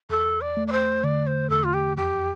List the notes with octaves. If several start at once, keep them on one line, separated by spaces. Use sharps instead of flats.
E2 A4
D5
A3
D5
C5
D3 D5
C5
E2 A4
F4
G4
F2 G4